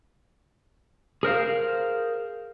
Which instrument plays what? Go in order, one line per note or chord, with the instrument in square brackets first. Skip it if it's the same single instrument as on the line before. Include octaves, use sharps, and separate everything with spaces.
[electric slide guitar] G#4 A#4 C5 F5